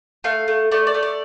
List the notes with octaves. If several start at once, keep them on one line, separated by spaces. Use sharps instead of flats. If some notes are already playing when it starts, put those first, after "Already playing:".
A3 F5
A3
A3 D5
D5
A3
D5